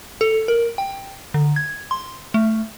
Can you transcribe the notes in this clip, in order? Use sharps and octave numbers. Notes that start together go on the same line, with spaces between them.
A4
A#4
G5
D3
G#6
C6
A3